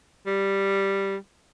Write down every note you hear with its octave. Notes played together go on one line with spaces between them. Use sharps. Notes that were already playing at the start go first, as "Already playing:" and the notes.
G3